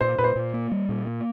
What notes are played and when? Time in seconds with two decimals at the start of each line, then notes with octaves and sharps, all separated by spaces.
0.01 A#2 C5
0.18 A#2 B4
0.24 C5
0.36 A#2
0.53 A#3
0.72 G3
0.89 A#2
1.07 A#3